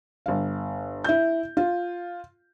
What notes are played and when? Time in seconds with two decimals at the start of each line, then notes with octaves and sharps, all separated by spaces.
0.26 G1 F5
1.04 E4 G6
1.57 F4